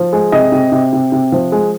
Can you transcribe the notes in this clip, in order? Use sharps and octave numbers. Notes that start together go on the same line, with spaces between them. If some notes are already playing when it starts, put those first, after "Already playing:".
Already playing: F3
G#3
C3 D#5
C3
C3
C3
C3
F3
G#3